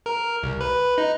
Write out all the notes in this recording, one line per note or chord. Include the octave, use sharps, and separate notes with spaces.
A#4
C2
B4
D#4